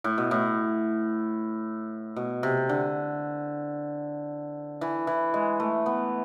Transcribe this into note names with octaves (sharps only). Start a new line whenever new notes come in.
A2
B2
A2
B2
C3
D3
E3
E3
G#3
A3
B3